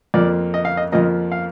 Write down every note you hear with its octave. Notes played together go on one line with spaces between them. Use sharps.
F2 F3 A#3 D5
D#5
F5
D#5
F2 F3 A#3 D#5
F5